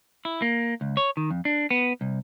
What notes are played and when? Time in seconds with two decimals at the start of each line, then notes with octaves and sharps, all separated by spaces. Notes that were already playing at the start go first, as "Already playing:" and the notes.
0.25 E4
0.42 A#3
0.81 C#2
0.97 C#5
1.17 D#3
1.31 F2
1.45 D4
1.71 B3
2.01 C2